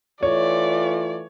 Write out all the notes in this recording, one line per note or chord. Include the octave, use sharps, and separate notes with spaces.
E3 A3 F4 C#5 D5